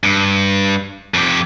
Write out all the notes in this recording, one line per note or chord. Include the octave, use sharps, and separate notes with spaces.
G2
F2 G4